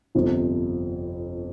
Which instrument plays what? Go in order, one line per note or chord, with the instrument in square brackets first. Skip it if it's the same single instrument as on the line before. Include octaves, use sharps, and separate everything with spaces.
[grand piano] G1 F2 C3 F3